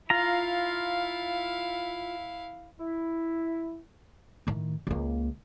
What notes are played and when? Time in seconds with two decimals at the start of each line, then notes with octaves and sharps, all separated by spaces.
0.10 E4 F4 F5 A#5
2.80 E4
4.47 A2 D#3
4.87 C#2 A#3